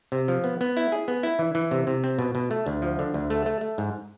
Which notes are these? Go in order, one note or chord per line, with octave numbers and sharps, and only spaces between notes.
C3
F3
B3
B3
E4
G#4
B3
E4
E3
E3
C3
C3
C4
B2
B2
A3
D2
F3
D3
D2
A3
A3
A3
G#2